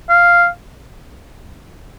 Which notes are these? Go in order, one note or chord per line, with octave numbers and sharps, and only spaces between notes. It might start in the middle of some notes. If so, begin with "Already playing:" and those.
F5